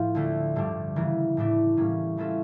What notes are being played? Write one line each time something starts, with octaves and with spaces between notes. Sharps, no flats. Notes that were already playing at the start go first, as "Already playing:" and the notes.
Already playing: A2 F3 F4
D2 D3 A3
G2 D3 G3 D4
C#3 E3 A#3
A2 E3 A3 D4 A4
A2 G3 A#3 C#4
E3 A3 C#4 F4 A4